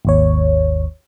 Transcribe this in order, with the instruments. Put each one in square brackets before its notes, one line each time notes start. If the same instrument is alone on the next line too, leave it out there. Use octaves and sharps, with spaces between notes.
[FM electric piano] G#1 D#2 C#5